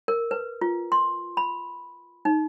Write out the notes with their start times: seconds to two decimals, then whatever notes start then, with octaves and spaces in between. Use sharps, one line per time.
0.08 A#4
0.31 B4
0.61 F4
0.92 C6
1.37 B5
2.25 D#4